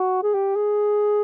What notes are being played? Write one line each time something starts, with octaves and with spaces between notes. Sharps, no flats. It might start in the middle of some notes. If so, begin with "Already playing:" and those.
Already playing: F#4
G#4
G4
G#4